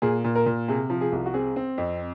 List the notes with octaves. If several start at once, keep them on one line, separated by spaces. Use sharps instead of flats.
A#2 G#4
A#2
A#4
A#2
C3 G#4
F3
G#4
C2
F#4
C4 G#4
C4
F2